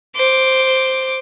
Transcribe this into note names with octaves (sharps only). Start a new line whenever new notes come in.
C5 D6